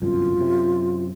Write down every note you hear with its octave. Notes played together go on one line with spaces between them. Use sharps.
G1 C2 F#2 F4
F#2 C3